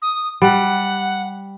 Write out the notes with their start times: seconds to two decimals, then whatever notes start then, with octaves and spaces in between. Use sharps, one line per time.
0.02 D#6
0.42 G3 F#5